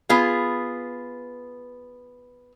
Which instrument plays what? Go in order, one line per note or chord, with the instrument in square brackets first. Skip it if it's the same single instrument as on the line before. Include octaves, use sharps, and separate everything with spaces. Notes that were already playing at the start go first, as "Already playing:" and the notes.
[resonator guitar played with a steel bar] B3 F4 G#4